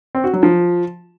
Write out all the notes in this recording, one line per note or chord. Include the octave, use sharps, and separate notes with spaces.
C4
F#4
F#3
F3